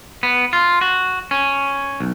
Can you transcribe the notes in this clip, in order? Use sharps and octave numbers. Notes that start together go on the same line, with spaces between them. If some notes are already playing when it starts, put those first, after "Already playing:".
B3
F4
F#4
C#4
B1